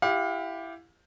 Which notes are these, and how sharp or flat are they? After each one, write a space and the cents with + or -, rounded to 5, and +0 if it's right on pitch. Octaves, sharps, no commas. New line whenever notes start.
E4 +20 G4 +0 F5 +35